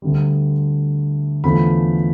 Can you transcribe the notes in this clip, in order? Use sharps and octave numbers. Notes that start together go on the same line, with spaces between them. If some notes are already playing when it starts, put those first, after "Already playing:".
D2 D3 G3
E2 D3 F3 A3 B5